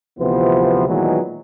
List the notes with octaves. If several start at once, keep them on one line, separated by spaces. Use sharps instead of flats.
D2 C3 E3 F3 B3 C5
A#2 D#3 E3 F#3 G#3 B3